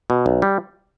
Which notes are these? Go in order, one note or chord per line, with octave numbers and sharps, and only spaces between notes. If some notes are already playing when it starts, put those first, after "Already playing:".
B2
B1
G3